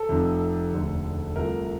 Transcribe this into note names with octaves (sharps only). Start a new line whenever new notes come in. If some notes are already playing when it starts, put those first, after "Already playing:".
Already playing: A4
F1 F2 C3
E1 D2 D3
C2 C3 F3 A3 A#4